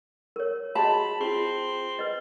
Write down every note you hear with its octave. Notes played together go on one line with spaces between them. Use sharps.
A#4 C#5
F#4 G#4 D#5 A5 B5
C4 F4 G#4
B4 D#5